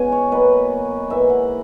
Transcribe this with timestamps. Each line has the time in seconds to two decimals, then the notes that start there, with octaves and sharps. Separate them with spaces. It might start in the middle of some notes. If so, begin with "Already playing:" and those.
Already playing: B2 G#3 C#4 E4 F#5 G#5
0.12 C#5
0.31 B2 F#3 A#3 B4
1.10 G#2 E3 A#3 E4 E5
1.30 F#5